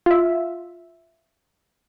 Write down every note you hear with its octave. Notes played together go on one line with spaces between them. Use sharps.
F4 E5